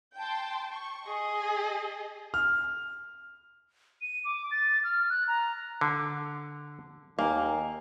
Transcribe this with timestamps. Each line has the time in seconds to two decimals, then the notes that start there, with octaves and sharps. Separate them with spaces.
0.17 G5 A5 C6
0.70 C#6
1.08 G#4 D#5
2.34 F6
4.02 D#7
4.25 D6
4.51 A6
4.84 F6
5.10 F#6
5.28 A#5
5.81 D3
7.19 D#2 A#3 G#5